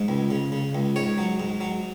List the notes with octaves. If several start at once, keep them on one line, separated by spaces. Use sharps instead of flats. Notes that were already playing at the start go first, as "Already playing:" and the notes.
Already playing: G#2
C#2
C#3
C#3
C#2
G#2 C#5
F#3
G#2
F#3